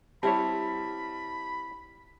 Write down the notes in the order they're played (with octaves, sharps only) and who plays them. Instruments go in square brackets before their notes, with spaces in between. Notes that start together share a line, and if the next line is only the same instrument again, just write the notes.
[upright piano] G3 [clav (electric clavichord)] C4 E4 C#5 [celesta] A5 [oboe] B5